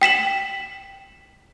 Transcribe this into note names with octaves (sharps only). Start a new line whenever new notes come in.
G5 B6 E7 F#7